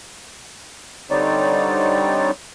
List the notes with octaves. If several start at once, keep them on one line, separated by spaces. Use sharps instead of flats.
D3 G3 C4 D#4 C#5 D5